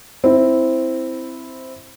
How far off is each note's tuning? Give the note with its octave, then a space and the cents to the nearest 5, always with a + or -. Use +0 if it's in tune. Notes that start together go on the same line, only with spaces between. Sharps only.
C4 +0 E4 +0